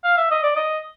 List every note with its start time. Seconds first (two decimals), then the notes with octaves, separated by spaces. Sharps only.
0.04 F5
0.17 E5
0.31 D#5
0.43 D5
0.56 D#5